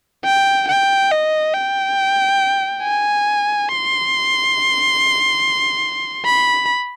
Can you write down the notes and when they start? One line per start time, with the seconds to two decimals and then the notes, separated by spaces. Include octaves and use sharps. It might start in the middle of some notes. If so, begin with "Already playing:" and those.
0.25 G5
0.68 G5
1.11 D#5
1.54 G5
2.83 G#5
3.69 C6
6.25 B5